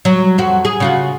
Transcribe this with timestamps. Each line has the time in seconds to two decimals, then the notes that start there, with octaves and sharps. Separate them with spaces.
0.05 F#3
0.38 F2 F#4
0.65 G#4
0.80 C#3 F4 F#4